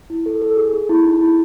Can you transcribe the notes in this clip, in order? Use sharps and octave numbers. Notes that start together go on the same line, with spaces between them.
E4
A4
A4
G#4
G#4
E4
D#4
E4